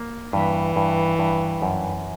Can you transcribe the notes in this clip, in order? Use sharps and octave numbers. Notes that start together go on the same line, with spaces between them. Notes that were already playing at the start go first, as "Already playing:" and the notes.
Already playing: A#3
G2 E3
G2
G2
F#2